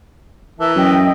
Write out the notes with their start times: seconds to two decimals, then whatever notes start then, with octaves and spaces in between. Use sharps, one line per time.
0.59 E3 A#4 E5 A5
0.76 F#2 D#5 E5 G5